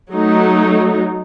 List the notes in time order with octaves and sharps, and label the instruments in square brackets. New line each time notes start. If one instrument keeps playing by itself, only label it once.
[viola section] F#3 A3 D#4